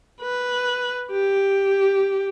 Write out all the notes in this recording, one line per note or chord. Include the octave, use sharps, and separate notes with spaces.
B4
G4